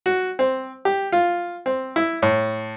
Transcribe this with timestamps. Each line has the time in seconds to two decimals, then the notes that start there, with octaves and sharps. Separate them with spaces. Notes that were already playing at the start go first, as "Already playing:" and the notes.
0.06 F#4
0.39 C4
0.85 G4
1.12 F4
1.66 C4
1.96 E4
2.22 A2